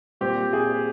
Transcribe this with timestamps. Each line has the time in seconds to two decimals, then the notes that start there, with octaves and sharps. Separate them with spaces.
0.21 A#2 G3 C4 G4
0.53 G#4